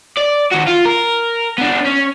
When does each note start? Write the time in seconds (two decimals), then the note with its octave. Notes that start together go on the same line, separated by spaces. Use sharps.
0.17 D5
0.52 D#3 F#4
0.67 F4
0.85 A#4
1.58 B3 D4
1.85 C#4